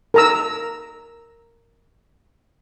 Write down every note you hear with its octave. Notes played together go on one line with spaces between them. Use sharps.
A#4 A#5 E6